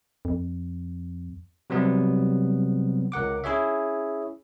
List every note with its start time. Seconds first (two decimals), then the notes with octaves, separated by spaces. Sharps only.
0.25 F2
1.70 C3 F#3 G3 B3 C4
3.12 C#2 A#4 F#5 D6
3.44 C#4 E4 G#4 C#5 E5